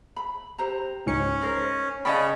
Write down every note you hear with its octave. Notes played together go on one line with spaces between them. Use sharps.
B5
G4 C5 A#5
C#2 G#2 C#4 C#7
D#4 A#4 C5
C#3 D5 D#5 G5 A5 B5